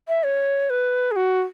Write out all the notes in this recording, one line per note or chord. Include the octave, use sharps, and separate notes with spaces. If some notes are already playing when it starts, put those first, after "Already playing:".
E5
C#5
B4
G#4
F#4